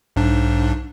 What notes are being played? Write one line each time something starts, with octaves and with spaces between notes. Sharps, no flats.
B1 G#2 D4